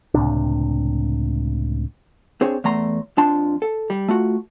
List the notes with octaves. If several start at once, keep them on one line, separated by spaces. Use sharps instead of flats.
C#2 A2 C3 D4
C4 D4 G#4 C5 C#5
E2 A3 A#5 C6
F2 F3 D4 A5 C6
A4
G3
A3 F4 F#4